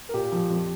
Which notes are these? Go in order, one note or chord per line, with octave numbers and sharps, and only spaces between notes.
A#4
A#2 G4
F3
F2